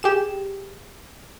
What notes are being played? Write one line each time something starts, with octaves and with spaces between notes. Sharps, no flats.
G4 G#4 E7